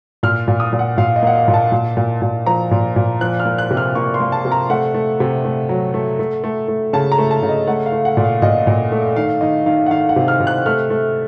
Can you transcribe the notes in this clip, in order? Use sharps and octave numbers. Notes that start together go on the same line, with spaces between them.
A#2 F6
A#2
D#6
A#2
F#5
A#2 F5
D#5
A#3 F#5
F5
A#2
A5
A#2
A#2
A#2
F3 A#5
A#2
A#2
F3 F#6
F6
A#3
F#6
C3
F6
A#3 C#6
C6
A#3
A5
C3
A#5
A3 F#5
A3
C3
A3
F#3
A3
A3
A3
A3
C#3 A5
A#5
A3
A5
C#3
D#5
A3 F#5
F5
A3
F#5
A#2
F5
A#2 D#5
A#2
A3
D#3 F5
D#3 D#5
D#3 F5
F#5
D#3 F5
F#5
C3
F6
C3
F#6
A3 F6
A3